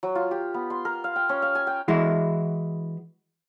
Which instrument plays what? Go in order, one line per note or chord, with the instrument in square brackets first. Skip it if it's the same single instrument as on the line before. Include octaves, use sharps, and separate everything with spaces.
[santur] F#3
F4
G4
B3
C6
A#4
F5
G5
C#4
F5
G#5
G5
[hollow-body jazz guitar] E3 G#3 E4 F#4